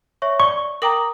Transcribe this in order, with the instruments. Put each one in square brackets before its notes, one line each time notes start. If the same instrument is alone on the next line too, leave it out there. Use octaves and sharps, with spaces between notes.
[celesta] C#5 E5 C#6
[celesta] D5 G7 [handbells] C#6
[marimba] A#4 G5 A#5 [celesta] D6 D#6 F#7